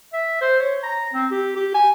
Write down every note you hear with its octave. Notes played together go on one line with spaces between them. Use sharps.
E5
C5
C#5
A#5
C4
G4
G4
G#5